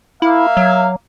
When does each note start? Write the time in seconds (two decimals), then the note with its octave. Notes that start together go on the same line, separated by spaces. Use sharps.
0.22 A#3 E4 E5 F5
0.57 F#3